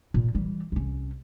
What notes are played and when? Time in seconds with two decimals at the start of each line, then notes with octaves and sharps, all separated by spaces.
0.14 A#2
0.35 E3 G3
0.72 C2 C#4